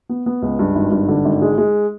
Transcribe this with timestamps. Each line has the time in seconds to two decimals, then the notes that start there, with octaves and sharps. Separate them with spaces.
0.09 B3
0.26 B3
0.42 C#2
0.59 G2
0.75 G#1
0.92 G2
1.08 D3
1.25 G#1
1.42 G#3
1.58 G#3